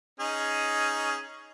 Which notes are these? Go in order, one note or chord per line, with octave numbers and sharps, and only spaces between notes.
C#4 D#4 G#4